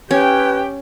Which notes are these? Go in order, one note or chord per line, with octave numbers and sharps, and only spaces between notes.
C#4 G4 B4 G5